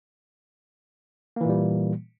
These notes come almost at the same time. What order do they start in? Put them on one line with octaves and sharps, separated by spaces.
A#3 E3 A#2 G3